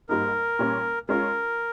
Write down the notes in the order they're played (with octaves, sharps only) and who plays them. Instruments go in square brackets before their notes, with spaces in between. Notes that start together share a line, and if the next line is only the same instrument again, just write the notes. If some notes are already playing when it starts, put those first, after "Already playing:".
[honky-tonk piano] G#2 G3 A#3 D#4 [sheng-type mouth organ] A#4
[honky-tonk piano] A#2 G3 C#4
[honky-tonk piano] G#3 C#4 F4 [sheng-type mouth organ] A#4